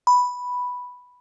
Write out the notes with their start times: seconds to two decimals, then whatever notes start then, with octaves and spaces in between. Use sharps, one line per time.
0.07 B5